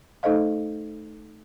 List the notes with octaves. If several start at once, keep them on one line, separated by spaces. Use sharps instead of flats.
A3 D#4 A4 C5 D#5 F5